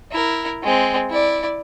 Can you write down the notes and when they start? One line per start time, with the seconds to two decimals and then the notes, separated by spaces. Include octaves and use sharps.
0.12 E4 A#4
0.63 G#3 C4
1.09 E4 D5